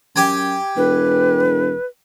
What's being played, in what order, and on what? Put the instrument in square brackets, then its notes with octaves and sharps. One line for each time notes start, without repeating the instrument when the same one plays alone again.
[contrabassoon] F#2 [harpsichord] G4 G5 G#5
[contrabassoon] E1 [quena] B4